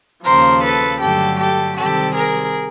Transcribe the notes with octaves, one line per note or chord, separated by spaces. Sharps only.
D#2 C#3 F3 A#4 C5
A4 B4
G2 D3 F#3 A3 G4 A4
G4 A4
C3 D#3 G3 C4 G4 A4
G#4 A#4